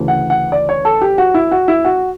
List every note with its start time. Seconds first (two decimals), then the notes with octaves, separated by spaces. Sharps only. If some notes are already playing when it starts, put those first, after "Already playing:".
Already playing: D2 C#3 E3
0.08 F#5
0.30 F#5
0.52 D5
0.69 C#5
0.85 A4
1.02 G4
1.18 F#4
1.34 E4
1.51 F#4
1.68 E4
1.85 F#4